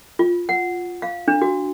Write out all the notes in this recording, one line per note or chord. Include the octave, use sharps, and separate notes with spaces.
F4
F#5
F5
D4
F#4